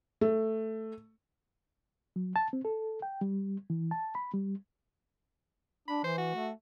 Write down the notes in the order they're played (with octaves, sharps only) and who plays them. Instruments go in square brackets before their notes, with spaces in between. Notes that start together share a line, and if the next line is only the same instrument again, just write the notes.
[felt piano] A3
[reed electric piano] F#3
A5
C4
A4
G5
G3
E3
A5
B5
G3
[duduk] D4 [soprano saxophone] B5
[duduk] E3 [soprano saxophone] C5
[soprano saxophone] F#4
[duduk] A3